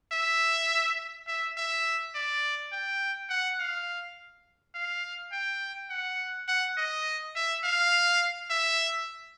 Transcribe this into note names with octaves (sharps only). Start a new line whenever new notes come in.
E5
E5
E5
D5
G5
F#5
F5
F5
G5
F#5
F#5
D#5
E5
F5
E5